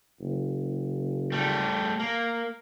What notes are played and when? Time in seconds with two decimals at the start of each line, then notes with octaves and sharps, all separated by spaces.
0.20 F#1
1.32 G3 A3
2.00 A#3